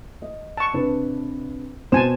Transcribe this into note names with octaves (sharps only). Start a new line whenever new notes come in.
D#5
A5 C#6
C3 D4 B4
B2 C5 G#5 A5 E7